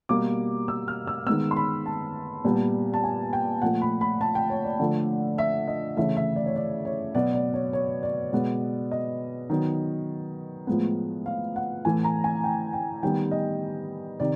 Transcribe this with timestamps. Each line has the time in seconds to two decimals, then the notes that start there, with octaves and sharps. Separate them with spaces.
0.09 B2 G3 A#3 D6
0.68 E6
0.88 F6
1.07 E6
1.26 D#3 G#3 B3 E6
1.51 C6
1.56 B5
1.86 A5
2.44 A#2 G3 B3
2.94 A5
3.04 G#5
3.33 G5
3.62 A#2 F3 A3 F#5
3.81 B5
4.01 B5
4.21 A5
4.35 G5
4.50 C#5
4.64 D5
4.80 D3 F3 A3
5.38 E5
5.68 D#5
5.97 C#3 E3 A3 E5
6.17 E5
6.36 D5
6.46 C#5
6.56 D5
6.85 C#5
7.15 B2 F#3 B3 D5
7.34 D5
7.54 C#5
7.73 C#5
8.03 D5
8.32 B2 G#3 B3
8.91 D#5
9.50 D#3 F#3 B3
10.67 A2 F3 G#3 B3
11.26 F5
11.56 F#5
11.85 A2 E3 A3 G#5
12.04 A#5
12.24 G#5
12.44 G5
12.73 G5
13.03 D#3 G3 B3 G5
13.31 D#5
14.20 C3 D#3 D5